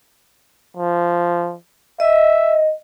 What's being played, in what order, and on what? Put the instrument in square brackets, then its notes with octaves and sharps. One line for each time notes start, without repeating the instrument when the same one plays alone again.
[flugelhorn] F3
[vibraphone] D#5 [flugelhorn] E5